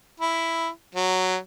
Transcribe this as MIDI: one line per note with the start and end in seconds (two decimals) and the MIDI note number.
0.20 0.69 64
0.95 1.37 54